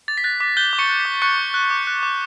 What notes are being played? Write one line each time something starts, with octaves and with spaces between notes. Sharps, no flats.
D6 A6
B6
F#6 A6
D6 B6
F#6 G6 G7
D6
C#6 C#7
F#6
B6
D6
C#6 F#6 C#7
D6
F#6
D6
F#6
D6